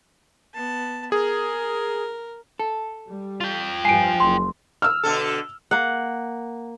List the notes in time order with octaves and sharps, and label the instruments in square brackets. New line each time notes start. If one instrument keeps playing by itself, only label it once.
[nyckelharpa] B3 A5
[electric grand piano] G#4 [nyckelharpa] A#4
[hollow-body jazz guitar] A4
[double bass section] G3
[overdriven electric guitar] F4 G5
[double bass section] G2 F3 [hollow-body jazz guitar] G#5 [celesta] C7 D7
[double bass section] F#1 [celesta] C6
[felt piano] E6 F6
[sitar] B2 D3 A4
[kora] A#3 F#5